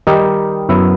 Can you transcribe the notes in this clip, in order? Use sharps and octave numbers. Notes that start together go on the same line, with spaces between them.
D#3 G3 D#4 G4
F#2 F#3 B3 E4